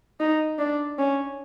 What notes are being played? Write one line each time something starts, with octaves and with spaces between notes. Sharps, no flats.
D#4
D4
C#4